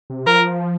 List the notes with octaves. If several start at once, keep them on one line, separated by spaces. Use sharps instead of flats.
C3
F3 A#4